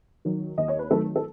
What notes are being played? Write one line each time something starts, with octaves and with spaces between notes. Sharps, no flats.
D#3 F#3
D#2 D#5
C#5
B4
D#3 F#3 A3 A4
A4